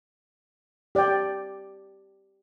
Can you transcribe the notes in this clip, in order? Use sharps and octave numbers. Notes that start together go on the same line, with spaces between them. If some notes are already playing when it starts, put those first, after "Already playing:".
G4 D5 G5